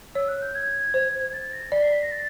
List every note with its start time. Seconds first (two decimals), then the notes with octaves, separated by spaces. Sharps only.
0.15 C#5 E6
0.28 F#6
0.42 G6
0.55 G#6
0.94 C5
1.33 A6
1.53 A#6
1.72 D5 B6
1.82 C7
1.92 B6
2.02 A#6
2.12 A6